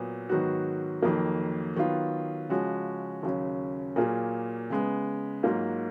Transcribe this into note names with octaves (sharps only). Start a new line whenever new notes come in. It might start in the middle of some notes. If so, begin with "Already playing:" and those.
Already playing: A#2 F#3 B3
G#2 D#3 F#3 B3 F#4
F2 D#3 F#3 A#3
D#3 F#3 B3 F4
C#3 F3 G#3 C#4 F#4
D#2 C#3 F#3 C#4
A#2 F#3 A#3 F4 G#4
C#3 G#3 B3
G#2 F#3 A#3 F4